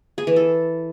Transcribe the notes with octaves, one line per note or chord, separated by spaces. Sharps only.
G#4
E3
A4